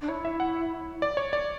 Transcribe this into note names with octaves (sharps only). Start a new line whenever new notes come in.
D4
E4 C#5
E5
F#5
D5
C#5
D5